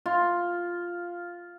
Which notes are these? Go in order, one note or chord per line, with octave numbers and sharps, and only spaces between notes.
F4